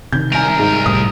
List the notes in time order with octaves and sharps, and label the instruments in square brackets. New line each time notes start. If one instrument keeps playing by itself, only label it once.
[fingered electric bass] C3 D#3 [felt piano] G6
[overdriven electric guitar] C2 A#4 [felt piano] G#5 D7
[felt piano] G#2
[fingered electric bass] F1 A2 G3 [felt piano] D#6